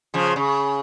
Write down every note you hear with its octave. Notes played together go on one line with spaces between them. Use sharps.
C#3 F3
C#3